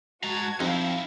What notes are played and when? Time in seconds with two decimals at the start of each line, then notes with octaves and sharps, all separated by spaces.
0.24 G#3 F#4 A5 A#5 G#6
0.60 F2 D#4 E4 F5 G5